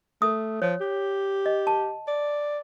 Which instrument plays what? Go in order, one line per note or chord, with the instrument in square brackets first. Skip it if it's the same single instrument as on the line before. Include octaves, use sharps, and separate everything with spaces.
[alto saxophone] A3 [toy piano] D#6
[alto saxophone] F3 [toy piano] C#5
[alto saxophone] G4
[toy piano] D#5
A5
[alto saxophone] D5